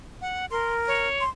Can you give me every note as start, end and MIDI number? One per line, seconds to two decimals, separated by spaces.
0.21 0.46 78
0.51 1.07 70
0.51 0.74 84
0.87 1.24 73
1.20 1.29 84